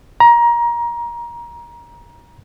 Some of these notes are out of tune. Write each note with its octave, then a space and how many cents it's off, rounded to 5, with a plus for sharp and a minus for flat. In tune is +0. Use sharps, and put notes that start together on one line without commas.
A#5 +25